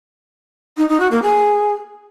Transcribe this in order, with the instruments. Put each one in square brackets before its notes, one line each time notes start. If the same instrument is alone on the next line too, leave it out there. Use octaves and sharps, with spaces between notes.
[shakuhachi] D#4
D#4
F#4
A#3
G#4